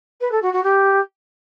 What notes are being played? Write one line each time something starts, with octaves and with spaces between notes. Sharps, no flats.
B4
A4
F#4
F#4
G4